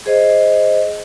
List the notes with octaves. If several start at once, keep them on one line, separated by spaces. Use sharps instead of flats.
G#4 C5 D#5